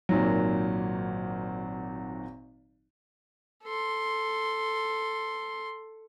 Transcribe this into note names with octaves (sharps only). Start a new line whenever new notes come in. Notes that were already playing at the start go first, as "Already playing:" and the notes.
G#1 A#2 D#3 F#3
A4 C6